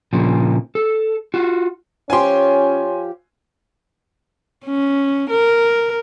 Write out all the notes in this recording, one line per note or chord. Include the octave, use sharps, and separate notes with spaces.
A#2 C#3 F3 A#3
A4
F4 F#4
F3 C#4 F4 G4 C#5 G#5 C6
C#4
A#4